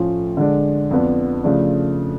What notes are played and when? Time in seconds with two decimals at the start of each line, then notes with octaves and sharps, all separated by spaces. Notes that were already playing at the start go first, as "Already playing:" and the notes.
Already playing: A2 F3 A3 C#4 F4
0.37 D3 G#3 D4
0.91 F2 F3 B3 D4
1.43 C#3 F3 A3 D4